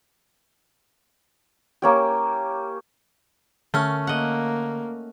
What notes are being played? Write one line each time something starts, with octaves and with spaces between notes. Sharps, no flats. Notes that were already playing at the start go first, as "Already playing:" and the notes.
A#3 C#4 G4
D3 A3 C#4 F6
A#3 D#5 F#5